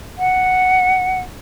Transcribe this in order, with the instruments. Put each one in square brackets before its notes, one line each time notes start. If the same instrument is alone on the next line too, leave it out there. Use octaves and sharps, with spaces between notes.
[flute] F#5